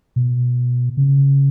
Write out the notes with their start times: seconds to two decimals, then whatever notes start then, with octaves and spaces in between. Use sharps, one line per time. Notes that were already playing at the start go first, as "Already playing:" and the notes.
0.16 B2
0.97 C#3